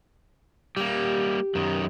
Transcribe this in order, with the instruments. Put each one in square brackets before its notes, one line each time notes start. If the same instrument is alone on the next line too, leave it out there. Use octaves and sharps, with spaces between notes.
[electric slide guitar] G3 A#3 [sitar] G4
[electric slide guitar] F#2 D#3